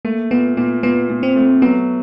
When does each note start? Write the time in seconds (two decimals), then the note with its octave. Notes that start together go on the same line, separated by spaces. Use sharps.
0.05 A3 A#3
0.31 A#2 B3
0.57 A#2 B3
0.83 A#2 B3
1.09 A#2
1.23 C4
1.36 A3
1.62 F#3 B3